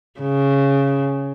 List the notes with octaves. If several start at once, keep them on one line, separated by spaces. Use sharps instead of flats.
C#3